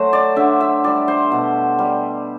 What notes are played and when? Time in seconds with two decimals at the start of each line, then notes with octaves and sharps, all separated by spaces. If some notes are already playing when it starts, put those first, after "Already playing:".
Already playing: F#3 A3 A4 C5
0.13 D5
0.36 D3 E5
0.60 E5
0.84 G3 D5
1.08 C5
1.32 B2
1.79 G3